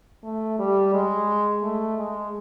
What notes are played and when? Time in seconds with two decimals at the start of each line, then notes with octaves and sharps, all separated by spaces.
0.23 A3
0.59 G3
0.94 G#3
1.62 A3
1.98 G#3